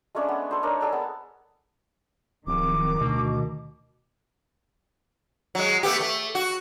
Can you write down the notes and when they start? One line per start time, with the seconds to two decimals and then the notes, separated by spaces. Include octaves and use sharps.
0.15 G#3 A3 C#4 D4
0.29 B3
0.51 A4 C5
0.63 D4 D#4 A#4 C#5
0.81 G#4 A4 D5
0.92 B3
2.47 D1 F2 D#3 D6
3.00 D2 B2
5.55 F#3 G#3
5.83 A3 B3 G4
6.01 A3
6.35 F#4